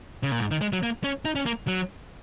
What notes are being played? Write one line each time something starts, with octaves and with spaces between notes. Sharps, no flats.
C#3
A#2
G#2
D#3
G#3
F#3
A#3
C#4
D#4
C#4
A#3
F#3